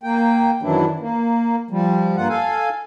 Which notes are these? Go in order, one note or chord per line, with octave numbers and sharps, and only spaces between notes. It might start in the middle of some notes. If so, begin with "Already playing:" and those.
A#3 G5
F#2 D#3 E3 F#3 D4 E4
A#3
F3 G3
G2 A#3 F4 F#5
A4 F5 G#5